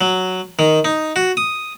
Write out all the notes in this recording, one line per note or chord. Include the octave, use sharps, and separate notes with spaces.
F#3
D#3
D#4
F#4
D#6